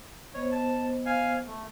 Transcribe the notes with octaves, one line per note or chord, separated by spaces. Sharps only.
B3 C5 C#5 D#5
A5
F5 G#5
A3